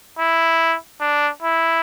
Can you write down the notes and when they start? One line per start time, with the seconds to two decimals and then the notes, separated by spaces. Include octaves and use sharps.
0.19 E4
1.01 D4
1.42 E4